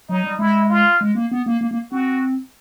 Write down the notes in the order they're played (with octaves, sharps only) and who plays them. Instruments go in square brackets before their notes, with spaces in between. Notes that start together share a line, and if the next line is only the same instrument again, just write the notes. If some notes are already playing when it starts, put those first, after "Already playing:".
[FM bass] F#3 [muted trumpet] D#4
[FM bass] G3
[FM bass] G#3 [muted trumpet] E4
[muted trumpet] F4
[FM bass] G#3
A#3
B3
A#3
A#3
A#3
[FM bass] C4 [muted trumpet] F#4